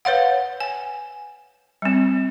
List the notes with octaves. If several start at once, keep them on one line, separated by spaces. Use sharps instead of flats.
B4 C#5 F5 F#5
G#5
G3 C4